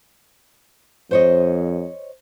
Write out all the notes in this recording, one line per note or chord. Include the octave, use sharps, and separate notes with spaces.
F2 C5 C#5 D#5